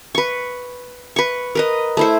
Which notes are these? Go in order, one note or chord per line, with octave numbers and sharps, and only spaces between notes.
B4 C#6
B4 C#6
A#4 B4 D#5
A3 E4 C5